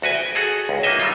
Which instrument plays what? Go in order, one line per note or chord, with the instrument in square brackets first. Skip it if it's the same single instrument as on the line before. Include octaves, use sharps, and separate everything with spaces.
[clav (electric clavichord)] D2 F#4 B4 G#5
G5
F#4 G#4 A4
C#2
A#3 D#4 F#4 D#5 E5
F#3 G3 D#4 F4